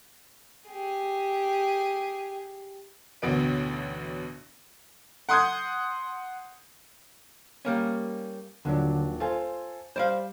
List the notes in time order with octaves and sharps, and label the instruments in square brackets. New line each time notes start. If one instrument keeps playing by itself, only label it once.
[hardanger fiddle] G4 G#4
[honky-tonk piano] A1 D2 B2 B3 D7
F#5 C6 D#6 G6 G#6
[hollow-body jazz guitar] G3 A#3 C#4
[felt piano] D#1 F#3 D4 [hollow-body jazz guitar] D3
[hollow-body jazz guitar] F4 [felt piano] A4 C5 G#5
[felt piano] G3 [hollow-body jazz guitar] C5 D5 F5